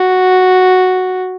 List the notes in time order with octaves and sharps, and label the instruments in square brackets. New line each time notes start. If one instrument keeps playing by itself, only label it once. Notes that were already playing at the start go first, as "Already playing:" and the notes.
Already playing: [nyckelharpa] F#4